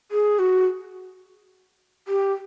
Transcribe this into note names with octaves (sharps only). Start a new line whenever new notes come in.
G#4
F#4
G4